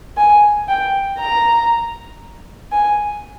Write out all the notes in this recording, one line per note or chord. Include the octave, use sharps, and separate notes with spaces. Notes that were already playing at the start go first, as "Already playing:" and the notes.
G#5
G5
A#5
G#5